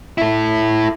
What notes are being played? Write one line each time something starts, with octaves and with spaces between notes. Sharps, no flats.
E4 A4